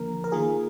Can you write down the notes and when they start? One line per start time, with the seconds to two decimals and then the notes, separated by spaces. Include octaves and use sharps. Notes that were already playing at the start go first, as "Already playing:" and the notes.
Already playing: D3 F3 A#3 A#4
0.24 A#4
0.32 D#3 A#3 F4 G#4